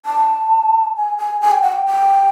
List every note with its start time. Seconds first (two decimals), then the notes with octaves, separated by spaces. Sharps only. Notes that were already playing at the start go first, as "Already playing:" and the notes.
0.06 A5
0.96 G#5
1.18 G#5
1.41 G#5
1.51 G5
1.62 F#5
1.72 G5
1.86 G5